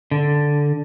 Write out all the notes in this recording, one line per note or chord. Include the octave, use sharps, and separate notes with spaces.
D3